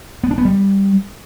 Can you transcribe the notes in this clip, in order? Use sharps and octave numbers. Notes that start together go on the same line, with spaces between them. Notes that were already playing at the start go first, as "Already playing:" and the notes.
B3
D4
B3
G3